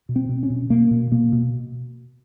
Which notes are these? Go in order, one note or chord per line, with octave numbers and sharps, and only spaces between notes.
B2
C4
B2
C#4
B2
B2 A#3
B2
B2 A#3
B2